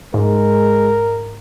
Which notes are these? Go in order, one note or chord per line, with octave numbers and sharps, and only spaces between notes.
G#2 G#3 A#4